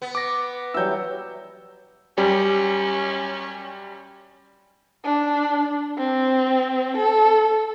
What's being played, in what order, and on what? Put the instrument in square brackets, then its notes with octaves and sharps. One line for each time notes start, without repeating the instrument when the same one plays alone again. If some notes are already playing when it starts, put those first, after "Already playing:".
[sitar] B3
[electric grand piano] D6 A#6
[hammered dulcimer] E3 F#3 G3 [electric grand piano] E6 G6
[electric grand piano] F#2 G3 G4 [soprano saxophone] C#4
[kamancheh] D4
C4
A4